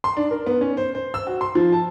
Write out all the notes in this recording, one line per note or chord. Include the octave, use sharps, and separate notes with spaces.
C6
D4
A#4
B3
C#4
C5
C5
E6
F#4
C6
F3
A5